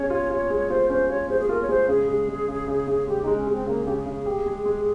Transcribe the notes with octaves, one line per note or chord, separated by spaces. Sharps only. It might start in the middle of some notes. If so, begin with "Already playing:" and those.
Already playing: C#4 G#4 C#5
F4
F4
G#3
F4 C5
C#4 C5
F4 C#5
G#3 C5
G#4
F4 A#4
C#5
G#3 C5
C#3 G#4
G#3
G#3
C#3
C#3
C#3
G#3 G4
G#3 D#4
C#4
G#3 C4
C#3 A#3
C#3 G4
G#4
C#3
G4
G#3
G#3